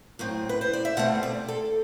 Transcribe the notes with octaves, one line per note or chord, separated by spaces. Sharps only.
A2 F#3 C4
B4
C5
D5
E5
B2 A3 C4 F#5
D5
A4